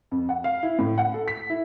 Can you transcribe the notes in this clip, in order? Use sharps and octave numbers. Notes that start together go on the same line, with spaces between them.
F2
F#5
F5
E4
A2
F#5
A4
B6
E4